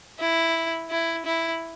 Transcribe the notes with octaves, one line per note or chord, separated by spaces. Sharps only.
E4
E4
E4